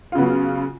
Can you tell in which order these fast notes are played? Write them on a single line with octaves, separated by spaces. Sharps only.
F4 C#3 B3 F#3